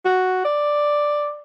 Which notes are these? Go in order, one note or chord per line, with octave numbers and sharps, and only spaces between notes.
F#4
D5